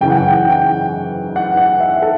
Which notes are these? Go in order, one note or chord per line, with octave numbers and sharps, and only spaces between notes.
F#2 C#3 E3 G5
F#5
G5
G5
G5
F#5
F#5
E5
A4